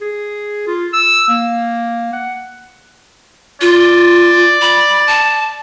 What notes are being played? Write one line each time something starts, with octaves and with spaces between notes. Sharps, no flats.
G#4
F4
E6
A#3
F#5
F4 D5
B5
A5